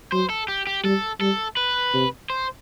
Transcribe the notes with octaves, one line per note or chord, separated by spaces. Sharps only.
F#3 C5
A4
G4
G4
G3 A4
G3 A4
B4
C3
C5